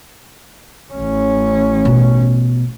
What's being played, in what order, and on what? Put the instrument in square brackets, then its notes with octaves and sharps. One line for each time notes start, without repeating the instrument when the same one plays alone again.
[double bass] A1 C#4
[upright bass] B2